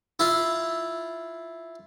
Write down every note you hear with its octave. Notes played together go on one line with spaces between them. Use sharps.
E4 F4